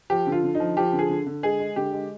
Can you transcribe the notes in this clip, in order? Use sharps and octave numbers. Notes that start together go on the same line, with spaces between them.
F3 G4
D3
F4
D3
D#4
F3
F3 G4
D3
G#4
D3
D3
G#3 G#4
G#3
D3 G4
G#3